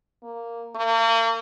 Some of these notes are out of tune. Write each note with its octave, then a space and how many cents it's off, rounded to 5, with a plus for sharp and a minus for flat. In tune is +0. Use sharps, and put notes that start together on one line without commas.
A#3 -5
A#3 -40